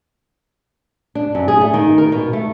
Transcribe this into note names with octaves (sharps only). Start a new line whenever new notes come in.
D4
F#2
G#4
A3
D#3
A#4
B2
A3